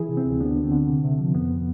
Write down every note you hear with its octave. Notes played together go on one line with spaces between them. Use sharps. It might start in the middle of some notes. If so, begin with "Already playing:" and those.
Already playing: E3 E4 G#4
C3
C4
D2
D2 B3 D4
D3
C4
D3
C3
C3
F3
F2 B3